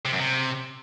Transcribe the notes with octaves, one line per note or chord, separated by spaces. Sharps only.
C3
F#2
C3